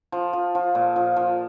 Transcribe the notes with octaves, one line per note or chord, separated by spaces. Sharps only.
F3
F3
F3
A#2
F3
F3